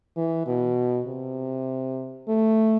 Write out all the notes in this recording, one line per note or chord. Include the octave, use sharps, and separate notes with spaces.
E3
B2
C3
A3